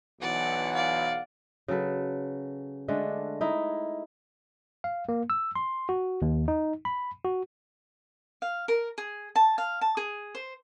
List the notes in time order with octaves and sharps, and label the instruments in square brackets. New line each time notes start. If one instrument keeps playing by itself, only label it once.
[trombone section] B1 E3 [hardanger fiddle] D5 [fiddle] F#5
[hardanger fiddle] D5 [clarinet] F5
[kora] C#3 F#3 A4 B4
D3 G#3 A3 D4
D#4 E4
[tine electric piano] F5
A#3
E6
C6
F#4
D#2
D#4
B5
F#4
[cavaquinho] F5
A#4
G#4
A5
F5
A5
G#4
C5